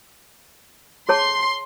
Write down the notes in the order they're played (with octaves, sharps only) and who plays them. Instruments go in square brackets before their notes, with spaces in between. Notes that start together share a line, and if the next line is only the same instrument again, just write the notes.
[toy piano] G#4 C#5 A5 [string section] C6